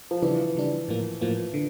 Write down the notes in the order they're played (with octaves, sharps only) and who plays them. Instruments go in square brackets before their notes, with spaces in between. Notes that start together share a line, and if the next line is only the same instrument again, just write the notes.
[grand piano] F3
[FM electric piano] C#3 G3 D4 [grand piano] E3
[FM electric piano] C#3 G3 D4
A2 F3 A#3
A2 F3 A#3
D3